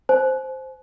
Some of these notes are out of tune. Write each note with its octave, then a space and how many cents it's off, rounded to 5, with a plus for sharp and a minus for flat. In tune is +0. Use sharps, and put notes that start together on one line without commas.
C5 +0 G#5 +45